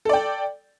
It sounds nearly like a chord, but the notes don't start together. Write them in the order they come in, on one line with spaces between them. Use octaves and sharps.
A4 D5 G5